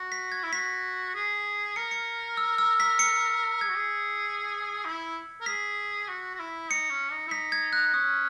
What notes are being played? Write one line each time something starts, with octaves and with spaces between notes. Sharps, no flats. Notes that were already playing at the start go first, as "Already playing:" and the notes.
Already playing: F#4
B6
G#6
E4
F#4 B6
G#4
A#4 C#7
C#7
E6
E6
B6
C#7
G#4 G#6
F#4
G#4
E4
A#4
G#4 B6
F#4
F#4
E4
D#4 C#7
C#4
D#4
E4
D#4 B6
G#6
F#6
C#4 D#6